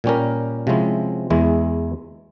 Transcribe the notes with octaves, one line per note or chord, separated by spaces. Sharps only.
A#2 G3 C#4 G4 A#4
C3 F3 G#3 C#4 E4
E2 E3 G#3 E4